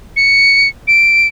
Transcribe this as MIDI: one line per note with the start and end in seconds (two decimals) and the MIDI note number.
0.16 0.68 97
0.88 1.28 98